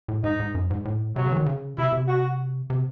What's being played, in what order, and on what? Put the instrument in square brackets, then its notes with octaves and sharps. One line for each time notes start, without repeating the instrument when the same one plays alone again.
[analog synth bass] A2
[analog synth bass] G#2 [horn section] D#4
[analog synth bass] G#2
F#2
G#2
A2
[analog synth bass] C3 [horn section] F#3
[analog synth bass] C#3
E3
D#3
C#3
[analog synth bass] C3 [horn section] E4
[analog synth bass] C3
[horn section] F#4
[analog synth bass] C3